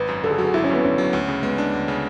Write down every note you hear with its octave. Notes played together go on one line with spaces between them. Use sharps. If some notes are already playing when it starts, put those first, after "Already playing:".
Already playing: G#1 B4
F#2
D3 A4
G#4
F#3 F#4
G#4
G#1 E4
C#4
F#2 B3
D3 C#4
F#3
D2
C#3
G#3 B3
D4
D2
C#3